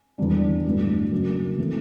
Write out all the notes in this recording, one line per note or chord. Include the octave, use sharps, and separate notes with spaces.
E2 D3 G3 D4
A1 G2 D3 F#3
F#1 F#2 F#3
E3 A3 C4